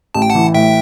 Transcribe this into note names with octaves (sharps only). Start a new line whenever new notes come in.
A1 A5
G5
F#5 A5
E3
A2 E5 G5